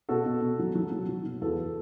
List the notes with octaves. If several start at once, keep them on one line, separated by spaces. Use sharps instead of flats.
B2 F#4 A4
B2
B2
F#3
F#3
F#3
F#3
B2
E2 F#4 A4